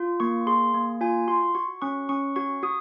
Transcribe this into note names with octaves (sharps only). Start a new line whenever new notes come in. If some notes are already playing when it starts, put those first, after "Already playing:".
Already playing: F4
A#3 C#6
G#4 C6
A#3
F4 G#5
F#4 C6
F#4 C#6
C#4 C#6
C#4 C#6
F#4 C#6
F#4 D#6